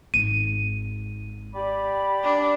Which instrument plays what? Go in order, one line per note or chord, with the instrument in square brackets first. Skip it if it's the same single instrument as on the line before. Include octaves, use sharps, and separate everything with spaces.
[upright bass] G#1 [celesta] D#7
[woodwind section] G4 D5 B5
[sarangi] D4